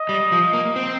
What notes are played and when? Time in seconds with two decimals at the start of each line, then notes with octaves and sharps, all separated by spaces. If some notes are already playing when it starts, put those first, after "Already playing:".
Already playing: D#5
0.09 G3
0.32 F3
0.54 A#3
0.76 C4